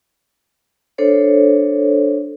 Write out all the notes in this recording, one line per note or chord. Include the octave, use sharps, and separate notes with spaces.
D4 A4 C5 C#5